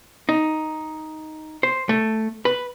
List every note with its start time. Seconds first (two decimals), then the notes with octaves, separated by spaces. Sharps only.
0.29 D#4
1.63 C5
1.89 A3
2.45 B4